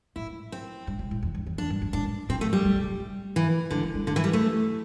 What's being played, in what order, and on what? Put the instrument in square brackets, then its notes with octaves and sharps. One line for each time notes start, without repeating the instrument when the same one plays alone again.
[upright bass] A2 [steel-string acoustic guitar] E4
[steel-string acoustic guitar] C4
[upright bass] G2
C3
A2
E2
G2
E2
[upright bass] E2 [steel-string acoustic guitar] D4
[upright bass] G2
G2
[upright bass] A2 [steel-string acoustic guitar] D4
[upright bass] A2 [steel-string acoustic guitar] C4
[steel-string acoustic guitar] A3
G3
[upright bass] G2
C3
A3
[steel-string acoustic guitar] E3
[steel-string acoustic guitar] D3 [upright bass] G3
[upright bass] A3
G3
[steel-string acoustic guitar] D3 [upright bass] A3
[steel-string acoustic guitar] E3
G3
A3